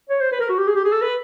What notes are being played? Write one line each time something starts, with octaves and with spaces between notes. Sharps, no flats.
C#5
C5
B4
A#4
F#4
G4
G#4
G4
G#4
A4
B4